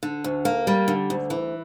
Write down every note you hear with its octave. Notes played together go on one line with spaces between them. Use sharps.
D3
D2
A#3
G3
D3
D2
E3